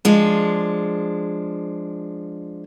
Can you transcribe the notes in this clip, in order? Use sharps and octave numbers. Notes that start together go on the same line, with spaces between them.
F3 G#3 D4